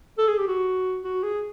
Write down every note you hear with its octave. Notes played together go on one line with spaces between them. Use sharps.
A4
G#4
G4
F#4
F#4
G#4